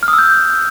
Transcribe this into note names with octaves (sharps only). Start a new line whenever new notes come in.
F6
D#6
E6
G6